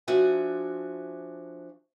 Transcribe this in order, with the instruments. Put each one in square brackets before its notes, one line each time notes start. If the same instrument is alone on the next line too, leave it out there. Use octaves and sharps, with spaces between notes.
[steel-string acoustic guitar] F3 D4 F#4 E5 G#5